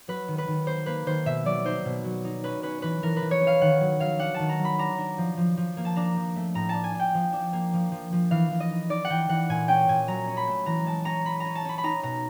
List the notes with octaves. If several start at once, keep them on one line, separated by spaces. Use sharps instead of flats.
F#3 B4
D#3
B4
D#3
A#3 C5
A#3 B4
D#3 C5
B2 E5
F#3 D5
D#4 C5
B2
F#3
D#4
C#4 B4
C#4 B4
E3 B4
E3 A#4
B4
E3
C#5
C#4
F5
D#3 F#5
F#3
F#3 F5
D4 F#5
D#3 A5
A#5
F#3
B5
D4 A#5
D4
F3
F3
F3
A#3
A5
D4 A#5
F3
A3
A2 A#5
D4 A5
G#5
D4 G5
F3
D4
A#3
F3
F3
F3
E3 F5
E3
D#5
D#4
D#4 D5
F#5
E3 G5
E3 F#5
A#2 G#5
C#4 G5
A#2 G#5
F#3 A#5
C#4
B5
A3
E3 A#5
G#3 A5
C#4 A#5
C#4 B5
C#4 A#5
A5
C#4 B5
B5
D#4 A#5
B2 A#5